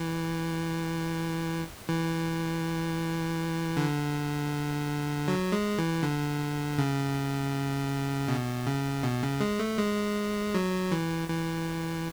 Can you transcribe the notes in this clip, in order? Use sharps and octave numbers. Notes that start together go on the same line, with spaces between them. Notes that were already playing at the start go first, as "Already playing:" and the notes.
Already playing: E3
E3
D3
F#3
G#3
E3
D3
C#3
B2
C#3
B2
C#3
G#3
A3
G#3
F#3
E3
E3